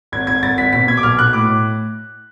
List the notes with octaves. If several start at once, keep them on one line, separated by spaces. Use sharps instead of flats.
G#1 G#6
G#1 G#6
G#1 A6
G#1 B6
B2 B6
B2 G#6
D6
B1 F6
B2 F#6
A2 D6